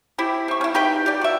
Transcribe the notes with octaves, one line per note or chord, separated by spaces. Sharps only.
C4 E4 G4
C4 C#6
C#4 E4
D#4 G4 B4 G5
G4 D5
F#4 E5